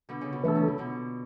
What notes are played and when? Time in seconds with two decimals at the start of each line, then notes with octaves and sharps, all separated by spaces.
0.09 B2 D3
0.21 C#3
0.33 B2
0.44 B2 E3 A3 D4 A4
0.55 C#3
0.67 B2
0.78 B2 D3